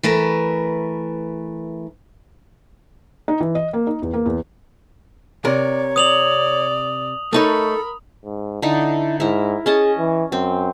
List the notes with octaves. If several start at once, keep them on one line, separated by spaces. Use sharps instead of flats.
E3 A3 A#4 B4
D#4
E3
D#5
A#3
D#4
E2
A#3
E2
C3 A#4 C#5 D5
D5 D#6 F7 F#7
A3 D#4 A4 A#4 C#5 B5
G#2
D3 D#4 E4
G#2 E4 A#4
C#4 G#4 D#5 A5
E3
F#2 C4